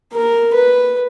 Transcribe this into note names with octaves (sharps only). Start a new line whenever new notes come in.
A#4
B4